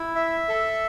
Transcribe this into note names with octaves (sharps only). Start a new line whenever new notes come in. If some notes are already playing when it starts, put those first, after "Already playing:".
Already playing: E4
E5
A4